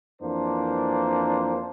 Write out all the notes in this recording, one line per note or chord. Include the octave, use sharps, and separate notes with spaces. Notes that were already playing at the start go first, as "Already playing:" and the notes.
F2 E3 A#3 D4 C5